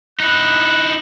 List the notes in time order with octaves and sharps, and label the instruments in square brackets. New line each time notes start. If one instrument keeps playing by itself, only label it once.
[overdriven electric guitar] D#4 E4 [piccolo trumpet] F#6